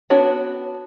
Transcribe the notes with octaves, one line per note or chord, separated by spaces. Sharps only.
B3 D4 F#4 C#5 F#5